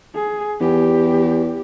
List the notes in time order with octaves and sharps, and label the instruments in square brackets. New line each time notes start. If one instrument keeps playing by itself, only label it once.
[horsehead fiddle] G#4
[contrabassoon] E2 [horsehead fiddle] G4